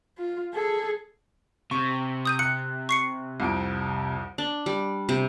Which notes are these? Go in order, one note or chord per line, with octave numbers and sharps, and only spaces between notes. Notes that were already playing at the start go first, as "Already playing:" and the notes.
F4
G#4 A4
C3 C#6
D#6 G6 D#7
F#6 C#7
C#6 C7 C#7
C2 F2 D7
D4
G3
C3